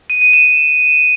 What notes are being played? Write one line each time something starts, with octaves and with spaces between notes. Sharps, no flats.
D#7
D#7
E7